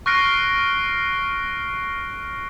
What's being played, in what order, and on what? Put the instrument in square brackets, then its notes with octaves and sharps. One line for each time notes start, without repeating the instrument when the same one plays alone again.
[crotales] C#6 F6 F#6 A#6 C7 D7